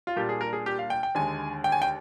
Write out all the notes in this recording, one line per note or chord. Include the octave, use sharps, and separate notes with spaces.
F4
A#2 G3 A#3 D4 G4
G#4
A#4
G#4
G4
F5
G5
G5
D#2 D3 G#3 G#5
G5
G#5
G5